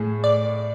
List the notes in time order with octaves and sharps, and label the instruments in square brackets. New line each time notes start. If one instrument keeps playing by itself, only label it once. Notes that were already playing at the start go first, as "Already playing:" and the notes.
Already playing: [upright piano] A2 [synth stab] G#4
[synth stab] D5